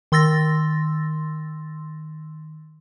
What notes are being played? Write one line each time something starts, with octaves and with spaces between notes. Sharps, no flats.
D#3 C6 E6 A6 A#6